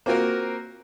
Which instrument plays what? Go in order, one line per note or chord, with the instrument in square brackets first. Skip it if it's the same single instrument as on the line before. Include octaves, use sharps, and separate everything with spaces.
[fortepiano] A#3 C4 F4 F#4 A#4